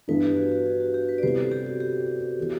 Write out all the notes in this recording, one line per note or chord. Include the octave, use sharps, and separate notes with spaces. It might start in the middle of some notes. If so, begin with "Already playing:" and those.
G2 E3 B3 D4 B4
G4
F#4
F#4
F#4
F#4
G4
B4
D5
C3 G3 B3 E4 C5
A4
G4
F#4
G4
E3 B3